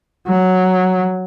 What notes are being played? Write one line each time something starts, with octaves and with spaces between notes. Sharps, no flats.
F#3